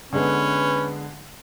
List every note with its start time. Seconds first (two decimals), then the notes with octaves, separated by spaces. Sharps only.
0.13 D3 G#3 B3 C#4 B4